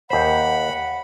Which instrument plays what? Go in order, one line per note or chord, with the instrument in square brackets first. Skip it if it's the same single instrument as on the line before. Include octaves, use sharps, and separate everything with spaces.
[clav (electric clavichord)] D#2 C5 [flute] F#5 [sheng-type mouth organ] B5